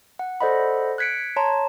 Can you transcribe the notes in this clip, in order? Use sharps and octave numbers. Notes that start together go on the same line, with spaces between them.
F#5
A4 C5 D5 D#5 F#5 B5
F#6 G#6 B6 C#7 D7
C#5 A5 A#5 C6